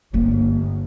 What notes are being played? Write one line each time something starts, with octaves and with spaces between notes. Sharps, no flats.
G1 A#3 C#4